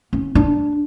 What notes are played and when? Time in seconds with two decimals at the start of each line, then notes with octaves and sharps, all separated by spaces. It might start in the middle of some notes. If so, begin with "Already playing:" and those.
0.13 C#4
0.35 D4